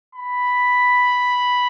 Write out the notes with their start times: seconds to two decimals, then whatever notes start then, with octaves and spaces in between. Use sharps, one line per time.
0.15 B5